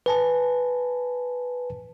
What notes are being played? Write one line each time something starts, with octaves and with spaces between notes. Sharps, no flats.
B4 G#5 A5